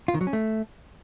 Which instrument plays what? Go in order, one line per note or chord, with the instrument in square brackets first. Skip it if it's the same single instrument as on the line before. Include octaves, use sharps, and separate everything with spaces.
[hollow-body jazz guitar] F4
D#3
F#3
C#4
A3